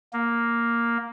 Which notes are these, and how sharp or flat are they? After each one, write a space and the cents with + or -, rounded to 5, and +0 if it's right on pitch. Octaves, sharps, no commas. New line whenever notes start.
A#3 +0